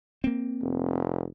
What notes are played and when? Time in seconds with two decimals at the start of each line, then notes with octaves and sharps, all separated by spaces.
0.24 A#3 C4
0.61 F1